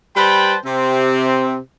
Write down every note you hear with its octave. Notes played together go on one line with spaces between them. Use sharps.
G3 B4 C5 G5 A5 B5
C3 C4